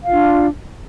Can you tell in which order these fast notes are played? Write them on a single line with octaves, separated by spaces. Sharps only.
F5 F4 D4